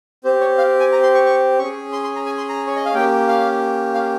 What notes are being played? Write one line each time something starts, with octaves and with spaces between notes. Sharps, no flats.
C4 G4 C5
C#5
F5
G#5
A#5
C6
C#6
C#6
C#4 G#4 C#6
C6
C6
A#5
G#5
C6
A#5
C#5
D#5
F5
A#3 C#4 G4 G5
F5
F5